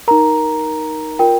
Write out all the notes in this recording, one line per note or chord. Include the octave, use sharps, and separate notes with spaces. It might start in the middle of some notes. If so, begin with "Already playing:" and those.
D#4 A#4 A#5
F4 A#4 G5